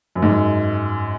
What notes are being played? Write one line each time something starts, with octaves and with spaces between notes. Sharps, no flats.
F#2
G#2
F#2